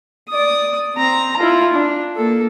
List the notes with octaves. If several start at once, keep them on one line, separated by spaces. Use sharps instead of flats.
D5 D#6
C4 A#5
E4 F4
D4
A#3 A4